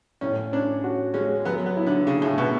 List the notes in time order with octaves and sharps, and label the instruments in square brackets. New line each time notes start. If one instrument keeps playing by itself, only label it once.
[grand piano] A2 [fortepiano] C#4
[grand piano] C#4 [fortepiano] D4
[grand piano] F#4
[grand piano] G#3 [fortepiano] C#4
[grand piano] F#3 [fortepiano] B3
[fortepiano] B3
[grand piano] E4
[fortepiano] D3
[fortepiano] C#3 [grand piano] G#4
[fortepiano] A2
[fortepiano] B2 [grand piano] B3